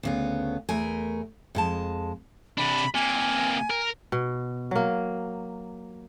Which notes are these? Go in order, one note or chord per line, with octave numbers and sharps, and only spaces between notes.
D2 C#3 B3
E2 A3 A#4 G#5
F2 G#3 A5
C3 D4 B5
C3 A#3 G#5
A#4
B2
F#3 A#3